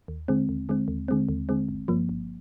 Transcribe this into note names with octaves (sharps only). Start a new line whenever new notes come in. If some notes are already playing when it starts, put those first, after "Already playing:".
D#2
D3 G#3 C4
D#2
D3 G#3 C4
D#2
D3 G#3 C4
D#2
D3 G#3 C4
G1
G2 F3 A#3
G1